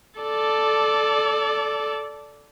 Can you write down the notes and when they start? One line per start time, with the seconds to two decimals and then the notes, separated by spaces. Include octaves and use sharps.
0.20 A4 D5